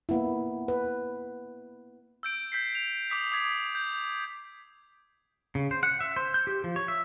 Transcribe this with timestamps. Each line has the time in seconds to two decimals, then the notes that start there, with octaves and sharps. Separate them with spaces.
0.09 A#3 B3 E4
0.68 B4
2.23 E6 G6 D7
2.52 G6 B6 C7
2.75 F7
3.10 D6 D#6 B6
3.32 D6 D#6 G#6 B6
3.75 G6
5.55 C#3
5.71 C5
5.83 F#5
6.01 E5
6.16 C5
6.34 G6
6.47 G4
6.64 F3
6.76 C#5
6.88 E5